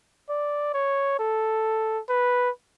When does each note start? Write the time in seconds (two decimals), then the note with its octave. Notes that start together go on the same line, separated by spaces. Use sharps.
0.29 D5
0.74 C#5
1.19 A4
2.09 B4